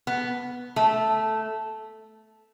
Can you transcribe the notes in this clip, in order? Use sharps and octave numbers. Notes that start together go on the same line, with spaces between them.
B3
A3